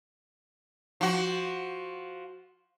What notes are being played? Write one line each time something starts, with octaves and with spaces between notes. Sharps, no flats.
F3 F#4